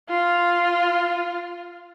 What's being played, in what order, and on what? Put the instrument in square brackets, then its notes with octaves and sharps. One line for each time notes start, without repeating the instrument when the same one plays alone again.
[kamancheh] F4